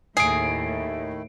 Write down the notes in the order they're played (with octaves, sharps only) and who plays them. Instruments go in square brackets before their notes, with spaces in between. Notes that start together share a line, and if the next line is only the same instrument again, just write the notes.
[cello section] D#2 A2 [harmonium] D#3 A3 E4 [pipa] G#4 [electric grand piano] C7 D7